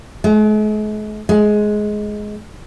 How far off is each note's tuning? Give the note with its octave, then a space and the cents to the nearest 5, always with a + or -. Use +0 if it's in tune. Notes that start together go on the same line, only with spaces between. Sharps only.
G#3 +45
G#3 +15